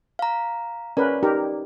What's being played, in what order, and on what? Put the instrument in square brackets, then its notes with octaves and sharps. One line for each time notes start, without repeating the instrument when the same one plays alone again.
[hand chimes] F5 A#5
[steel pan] C#4 A#4 B4 [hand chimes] D5
[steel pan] D#4 G4 A#4